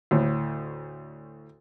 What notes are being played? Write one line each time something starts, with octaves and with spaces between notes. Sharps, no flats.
D2 A2